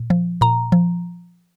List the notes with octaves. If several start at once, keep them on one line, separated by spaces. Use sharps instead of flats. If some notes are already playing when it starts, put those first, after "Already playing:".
Already playing: A#2
F3
A#2 A#5
F3